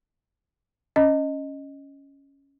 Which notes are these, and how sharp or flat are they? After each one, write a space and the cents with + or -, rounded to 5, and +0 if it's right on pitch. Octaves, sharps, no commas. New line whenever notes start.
C#4 +0 D#5 +0